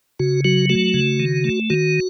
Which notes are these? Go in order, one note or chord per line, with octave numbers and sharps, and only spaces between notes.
C#3 F#4
F#3 F#4
A3 F#4
C#3
D#3
A3
D#3 F#4